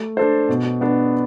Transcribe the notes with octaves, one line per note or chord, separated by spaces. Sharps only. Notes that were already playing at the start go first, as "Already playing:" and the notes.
Already playing: A3
D4 A4 C5
B2
B3 D4